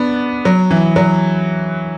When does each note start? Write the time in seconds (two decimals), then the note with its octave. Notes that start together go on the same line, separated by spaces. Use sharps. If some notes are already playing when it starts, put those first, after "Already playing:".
Already playing: B3 D4
0.45 F#3
0.71 E3
0.96 F#3